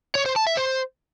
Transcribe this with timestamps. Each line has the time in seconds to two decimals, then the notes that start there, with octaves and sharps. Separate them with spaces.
0.15 C#5
0.26 C5
0.36 A5
0.47 E5
0.57 C5